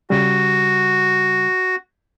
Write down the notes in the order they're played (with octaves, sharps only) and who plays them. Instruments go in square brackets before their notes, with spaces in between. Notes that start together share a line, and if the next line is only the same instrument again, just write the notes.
[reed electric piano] C#3 G3 [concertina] F#4